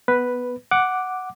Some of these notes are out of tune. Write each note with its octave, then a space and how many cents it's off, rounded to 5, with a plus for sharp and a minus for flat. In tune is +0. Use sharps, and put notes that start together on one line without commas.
B3 +0 B4 +0
F#5 +0 D6 +0